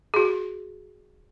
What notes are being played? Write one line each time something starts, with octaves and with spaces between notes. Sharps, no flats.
F#4 G#4